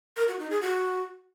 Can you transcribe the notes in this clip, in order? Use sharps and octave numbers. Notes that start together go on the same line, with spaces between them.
A#4
F#4
D#4
G#4
F#4